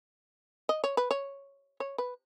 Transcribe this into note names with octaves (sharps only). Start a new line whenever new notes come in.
D#5
C#5
B4
C#5
C#5
B4